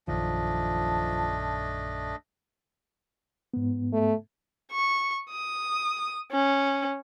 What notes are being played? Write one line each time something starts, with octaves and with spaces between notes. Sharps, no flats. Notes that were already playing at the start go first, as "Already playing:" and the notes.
A#1 F#2 D#3 F3 A3 D4 D#5 A5
G#2 B3
A3
C#6
D#6
C#4